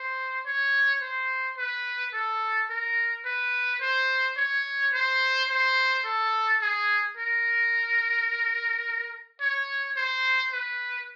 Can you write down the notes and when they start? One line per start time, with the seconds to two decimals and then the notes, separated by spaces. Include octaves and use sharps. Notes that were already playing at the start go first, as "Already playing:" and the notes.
Already playing: C5
0.46 C#5
1.02 C5
1.57 B4
2.13 A4
2.70 A#4
3.25 B4
3.81 C5
4.37 C#5
4.93 C5
5.49 C5
6.05 A4
6.61 G#4
7.17 A#4
9.40 C#5
9.96 C5
10.52 B4